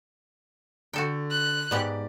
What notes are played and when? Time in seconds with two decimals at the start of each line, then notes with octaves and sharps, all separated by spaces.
0.93 D3 F#4 A4 G5
1.31 F#6
1.71 G#2 G#3 B3 G4 D5